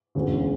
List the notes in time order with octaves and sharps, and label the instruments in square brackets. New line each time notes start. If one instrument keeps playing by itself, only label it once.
[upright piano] E1 D2 C#3